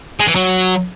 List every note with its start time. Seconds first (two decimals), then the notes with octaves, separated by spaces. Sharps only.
0.20 G#3
0.28 E3
0.35 F#3